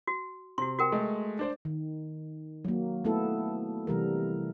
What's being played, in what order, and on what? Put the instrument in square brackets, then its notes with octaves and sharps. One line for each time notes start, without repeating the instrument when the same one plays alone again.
[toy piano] F#4
[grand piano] C3 [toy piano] F#4 C6
[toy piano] F#4 A#4 G5
[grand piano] G#3 A3
D4 C5 D5
[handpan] D#3
F#3 A#3
A3 B3 E4 A4
C3 E3 G3 A#4